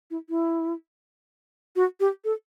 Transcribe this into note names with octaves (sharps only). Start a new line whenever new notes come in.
E4
E4
F#4
G4
A4